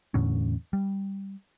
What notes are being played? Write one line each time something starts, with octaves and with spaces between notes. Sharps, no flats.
E2 A2 D3 C#4
G3